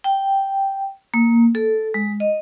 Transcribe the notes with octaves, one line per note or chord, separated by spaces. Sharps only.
G5
A#3
A4
G#3
D#5